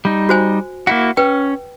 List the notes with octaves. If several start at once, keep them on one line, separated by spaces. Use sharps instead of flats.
G3 D#4
F#4 C5 G#5
A#3 E4 F#4 F#5
C#4 B4 G5